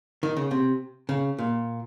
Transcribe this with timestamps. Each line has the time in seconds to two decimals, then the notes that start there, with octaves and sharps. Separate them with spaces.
0.23 D#3
0.37 C#3
0.51 C3
1.09 C#3
1.39 A#2